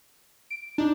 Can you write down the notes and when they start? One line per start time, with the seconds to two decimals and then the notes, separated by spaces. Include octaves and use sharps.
0.50 D7
0.78 D4 D#4